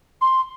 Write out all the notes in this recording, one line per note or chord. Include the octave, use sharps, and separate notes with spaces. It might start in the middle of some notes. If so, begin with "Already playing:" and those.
C6